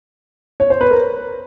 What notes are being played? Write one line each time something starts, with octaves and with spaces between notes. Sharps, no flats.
C#5
C5
B4
A#4